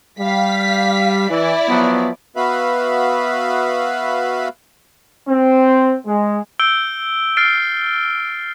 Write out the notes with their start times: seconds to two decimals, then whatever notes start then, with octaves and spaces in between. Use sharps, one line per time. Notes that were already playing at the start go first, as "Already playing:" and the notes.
0.19 G3 F5 B6
1.29 E3 E4 D5
1.69 F3 F#3 B3
2.36 B3 F#4 B4 E5 F5 B5
5.28 C4
6.06 G#3
6.60 E6 G6 D7 G7
7.37 F6 A6 C7 D7